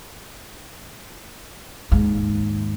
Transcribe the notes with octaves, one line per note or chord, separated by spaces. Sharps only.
D#2 G#2